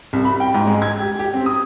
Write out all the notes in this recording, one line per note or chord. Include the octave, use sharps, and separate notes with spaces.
C2
B5
G5
G#2
G#3
G#6
G4
G4
C4
D#6